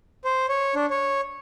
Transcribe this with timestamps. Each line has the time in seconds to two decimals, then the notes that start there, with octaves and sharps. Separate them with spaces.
0.25 C5
0.49 C#5
0.75 D4
0.90 C#5